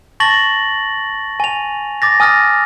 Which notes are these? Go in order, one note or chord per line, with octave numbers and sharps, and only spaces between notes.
A5 C#6 A6 A#6 F#7
G#5 F7
D6 A6 A#6
G#5 D#6 F6 A6 A#6